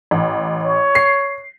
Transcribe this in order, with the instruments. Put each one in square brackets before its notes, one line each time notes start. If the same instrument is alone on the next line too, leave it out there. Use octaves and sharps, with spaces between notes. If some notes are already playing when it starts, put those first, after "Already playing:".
[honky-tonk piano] A1
[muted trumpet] C#5
[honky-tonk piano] C7